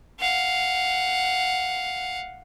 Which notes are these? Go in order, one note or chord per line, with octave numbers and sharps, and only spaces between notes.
F5 F#5